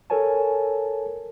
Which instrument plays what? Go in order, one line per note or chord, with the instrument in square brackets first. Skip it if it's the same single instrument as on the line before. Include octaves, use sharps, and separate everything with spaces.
[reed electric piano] A4 A#4 C#5 G#5 A5